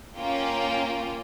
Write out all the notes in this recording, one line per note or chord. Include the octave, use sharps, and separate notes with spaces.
A#3 C#4 F4 G5